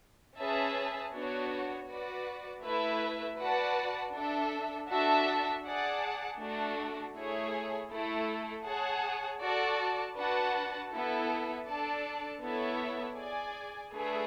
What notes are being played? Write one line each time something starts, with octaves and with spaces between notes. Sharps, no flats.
C#4 G#4 B4 E5 A5
B3 D4 F#4 C#5
F#4 B4 D5
A3 E4 B4 E5
F#4 B4 D5 F#5 A5
D4 A4 E5
D4 F#4 A4 E5 A5
G#4 D5 F#5 A5
A3 D4 F#4
A3 E4 G#4 C#5
A3 E4 A4
G#4 C#5 F#5 A5
F#4 A4 D5 A5
D4 F#4 B4 F#5 A5
B3 E4 A4
D4 A4 D5 A5
B3 E4 A4 C#5 E5
G#4 D5 G#5
A3 D4 G#4 B4 E5